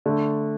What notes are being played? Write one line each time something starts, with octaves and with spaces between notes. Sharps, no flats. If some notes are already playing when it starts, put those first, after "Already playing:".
D3 A3 D4